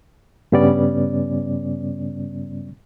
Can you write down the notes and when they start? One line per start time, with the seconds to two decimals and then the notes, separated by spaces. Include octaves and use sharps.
0.52 G2 C#3 G3 B3 C#4 D5